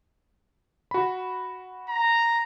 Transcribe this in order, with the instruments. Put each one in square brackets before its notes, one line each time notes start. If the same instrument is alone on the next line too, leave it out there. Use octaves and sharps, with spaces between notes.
[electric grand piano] F#4 B5
[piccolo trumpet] A#5